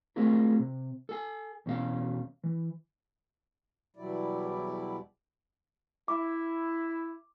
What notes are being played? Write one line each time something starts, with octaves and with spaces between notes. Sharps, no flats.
A3 C4 F4 G#4 A#4
C3
A4 G#5
E2 B2 C#4 F#4 F5
E3
E2 B2 F#3 G3 E4 D5
E4 D6